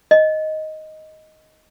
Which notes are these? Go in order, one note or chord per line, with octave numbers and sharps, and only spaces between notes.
D#5